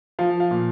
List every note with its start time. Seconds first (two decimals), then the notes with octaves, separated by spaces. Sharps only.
0.19 F3 F5
0.40 F5
0.51 A#2